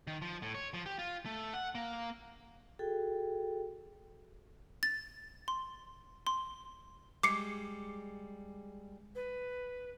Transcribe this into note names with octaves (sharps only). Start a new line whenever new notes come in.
D#3
F3
A2
C#5
F3
G4
F4
A3
F#5
A#3
F#4 G#4 A4 G5
A6
C6
C6
G3 G#3 D6 C7 C#7
B4